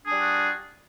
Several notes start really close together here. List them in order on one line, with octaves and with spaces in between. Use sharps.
D4 G#4 G3 F4 F#4